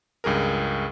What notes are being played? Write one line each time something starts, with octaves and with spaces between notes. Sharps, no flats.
C#2 G2 G#4 A#4